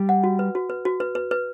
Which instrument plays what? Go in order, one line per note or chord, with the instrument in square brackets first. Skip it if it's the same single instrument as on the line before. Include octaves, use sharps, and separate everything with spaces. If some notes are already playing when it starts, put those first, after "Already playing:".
Already playing: [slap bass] G3
[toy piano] F#5
F#4
B4
F#4
B4
F#4
B4
B4
B4